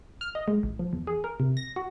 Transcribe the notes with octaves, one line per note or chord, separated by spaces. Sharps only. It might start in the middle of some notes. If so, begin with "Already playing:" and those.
F6
D#5
G#3
A1
F3
E2
G#4
A#4
C3
A#6
F#4